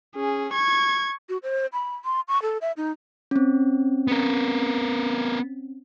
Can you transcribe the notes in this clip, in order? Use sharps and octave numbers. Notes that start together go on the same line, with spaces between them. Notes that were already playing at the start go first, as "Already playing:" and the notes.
C#4 G#4
C#6 G#6
F#4
C5
B5
C6
C#6
A4
E5
D#4
C4 C#4
B3 A#4